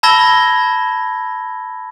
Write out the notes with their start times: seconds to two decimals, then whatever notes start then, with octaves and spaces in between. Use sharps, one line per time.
0.03 A5 B5 E6 G#6 A#6 G7